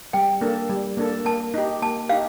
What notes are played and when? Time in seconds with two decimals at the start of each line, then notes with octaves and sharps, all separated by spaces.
0.13 G3 G5
0.41 A#3 D4 A4
0.69 G3
0.97 A#3 D4 A4
1.25 A#3 A5
1.54 D#4 G4
1.82 A#3 A5
2.09 D#4 G4 F5